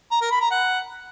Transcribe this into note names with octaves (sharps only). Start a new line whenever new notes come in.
A#5
A#4
B5
A#5
F#5